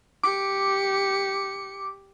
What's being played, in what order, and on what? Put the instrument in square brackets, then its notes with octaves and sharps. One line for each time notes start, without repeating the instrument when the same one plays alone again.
[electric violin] G4 C#7 [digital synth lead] D6